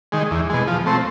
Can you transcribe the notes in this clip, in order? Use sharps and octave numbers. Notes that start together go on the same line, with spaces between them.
D#3 G#3
E2
B2 G#3
F3
A3 C4